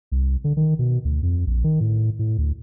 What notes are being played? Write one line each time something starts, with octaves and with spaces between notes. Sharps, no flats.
C2
D3
D#3
B2
D2
F2
A#1
D#3
A2
A2
D2